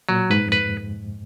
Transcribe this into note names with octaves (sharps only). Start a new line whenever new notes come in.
A#2 F#3
G#2 B4
F2
B4